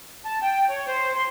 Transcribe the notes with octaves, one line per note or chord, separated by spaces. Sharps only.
A5
G5
C#5
C5
C6